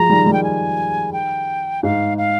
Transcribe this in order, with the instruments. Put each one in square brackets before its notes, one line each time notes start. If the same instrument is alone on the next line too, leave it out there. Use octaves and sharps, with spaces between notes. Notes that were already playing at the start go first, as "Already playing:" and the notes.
Already playing: [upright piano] F3 G#3 [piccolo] A#5
[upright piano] D#3 G3
D#3 G3
[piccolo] G5
G#5
G5
[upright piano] G#2 [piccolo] F5
[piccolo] F5